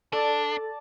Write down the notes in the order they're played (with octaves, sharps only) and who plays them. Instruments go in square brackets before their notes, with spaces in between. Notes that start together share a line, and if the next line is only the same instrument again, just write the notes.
[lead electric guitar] D4 [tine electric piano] A4 [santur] D5 A5